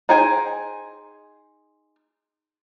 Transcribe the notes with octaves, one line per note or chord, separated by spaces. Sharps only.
D#4 G#4 C5 G5 G#5